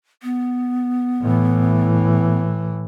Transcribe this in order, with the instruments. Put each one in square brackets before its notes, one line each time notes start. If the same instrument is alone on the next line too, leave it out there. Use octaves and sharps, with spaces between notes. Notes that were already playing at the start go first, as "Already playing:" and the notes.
[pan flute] B3
[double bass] A2 E3